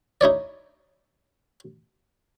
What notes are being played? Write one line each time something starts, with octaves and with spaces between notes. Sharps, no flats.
D#4 E4 C#5 D5